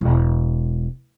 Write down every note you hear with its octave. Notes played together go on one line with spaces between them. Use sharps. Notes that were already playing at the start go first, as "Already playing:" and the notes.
E1